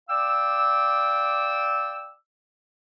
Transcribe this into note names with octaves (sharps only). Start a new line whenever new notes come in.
D5 F5 G5 D6 E6